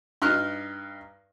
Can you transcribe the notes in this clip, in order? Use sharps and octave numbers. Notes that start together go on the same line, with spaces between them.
G2 D#4 F6 F#6